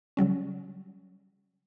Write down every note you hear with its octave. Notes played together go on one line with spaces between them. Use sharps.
C#3 F#3 G3 C#4